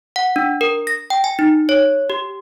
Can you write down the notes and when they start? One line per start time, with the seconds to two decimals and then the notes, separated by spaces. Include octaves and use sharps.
0.16 F#5
0.36 D4
0.61 A#4
0.87 A#6
1.10 G5
1.24 G#5
1.39 D#4
1.69 C#5
2.10 G4